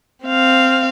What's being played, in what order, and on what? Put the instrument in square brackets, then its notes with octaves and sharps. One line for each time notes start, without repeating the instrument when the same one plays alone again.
[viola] C4 F5